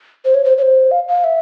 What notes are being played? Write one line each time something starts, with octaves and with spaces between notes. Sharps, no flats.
C5
C#5
C5
C#5
C5
F5
F5
E5